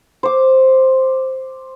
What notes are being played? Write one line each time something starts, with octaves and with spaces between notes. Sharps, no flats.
C5 D6